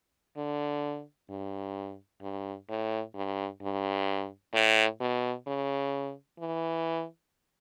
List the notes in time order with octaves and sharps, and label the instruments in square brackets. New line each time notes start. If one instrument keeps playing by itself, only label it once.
[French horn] D3
G2
G2
A2
G2
G2
A2
B2
C#3
E3